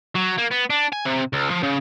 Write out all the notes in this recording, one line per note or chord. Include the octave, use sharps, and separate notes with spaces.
F#3
A#3
B3
D4
G#5
C3
C#2
F3
C#3